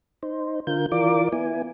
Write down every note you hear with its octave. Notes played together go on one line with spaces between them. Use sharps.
D#4 C5
D3 F4 A#4 G6
E3 F4 A#4 D5 D6
B3 E4 G#5